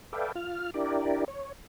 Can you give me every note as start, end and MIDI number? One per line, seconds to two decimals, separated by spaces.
0.13 0.32 69
0.13 0.32 71
0.13 0.32 74
0.13 0.32 76
0.13 0.32 77
0.13 0.32 79
0.35 0.70 65
0.35 0.70 89
0.74 1.24 62
0.74 1.24 64
0.74 1.24 67
0.74 1.24 70
0.74 1.24 74
1.28 1.52 73